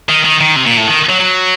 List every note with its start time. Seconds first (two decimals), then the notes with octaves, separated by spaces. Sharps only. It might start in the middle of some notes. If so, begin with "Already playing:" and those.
0.09 D#3
0.25 D#3
0.40 D#3
0.56 C3
0.66 A#2
0.77 A2
0.87 D#3
1.09 F#3
1.20 F#3